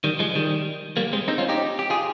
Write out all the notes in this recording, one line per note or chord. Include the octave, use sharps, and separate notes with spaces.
D#3 G3
F3 G#3
D#3 G3
G3 A#3
G#3 C4
C4 D#4
C#4 F4
D#4 G4
G4
F4 G#4